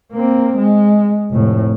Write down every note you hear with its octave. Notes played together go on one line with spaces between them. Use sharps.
A#3 C4
G#3
F1 A2